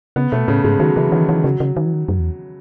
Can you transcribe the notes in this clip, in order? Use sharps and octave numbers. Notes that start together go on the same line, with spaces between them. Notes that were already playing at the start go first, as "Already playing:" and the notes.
C#3 B3
B2 A3
A2 C#3
G#2 G#3
D#3 F#3
C#3 E3
D#3 E3
E3 F#3
C#3 F#3
C#3
D#3
E3
D#3
F#2
E2